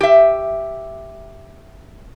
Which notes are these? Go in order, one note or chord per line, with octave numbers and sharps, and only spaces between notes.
G4 E5